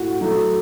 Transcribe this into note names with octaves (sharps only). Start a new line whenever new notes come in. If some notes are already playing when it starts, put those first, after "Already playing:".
Already playing: A2 F#4
F#3 A3